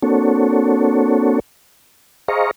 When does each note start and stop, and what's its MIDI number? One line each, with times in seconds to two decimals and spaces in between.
0.02 1.40 58
0.02 1.40 60
0.02 1.40 62
0.02 1.40 66
0.02 1.40 69
0.02 1.40 73
2.28 2.51 68
2.28 2.51 72
2.28 2.51 75
2.28 2.51 77
2.28 2.51 82
2.28 2.51 85